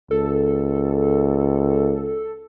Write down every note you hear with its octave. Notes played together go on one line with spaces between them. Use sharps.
C#2 A4